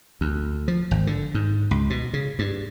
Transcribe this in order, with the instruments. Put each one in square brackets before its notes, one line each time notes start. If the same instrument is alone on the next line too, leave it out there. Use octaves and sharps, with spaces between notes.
[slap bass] D2
F3
G#1
D3
G#2
C#2
B2
C#3
G2